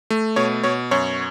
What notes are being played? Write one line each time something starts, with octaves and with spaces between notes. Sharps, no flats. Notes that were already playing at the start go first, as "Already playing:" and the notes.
A3
B2 C#5
B2 C#5
F#2 C#5